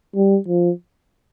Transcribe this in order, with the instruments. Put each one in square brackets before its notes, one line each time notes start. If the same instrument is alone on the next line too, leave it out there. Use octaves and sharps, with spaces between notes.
[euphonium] G3
F3